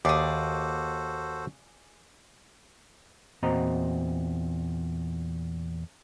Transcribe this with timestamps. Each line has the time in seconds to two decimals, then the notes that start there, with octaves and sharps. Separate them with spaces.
0.05 D#2 F#4 G#4 A4 C5 D5
3.43 E2 A#2 C4 F#4 D#5 A#5